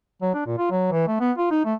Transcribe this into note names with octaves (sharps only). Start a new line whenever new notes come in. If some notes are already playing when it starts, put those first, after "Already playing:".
F#3
D4
A#2
F4
F#3
E3
A3
B3
F4
D#4
A3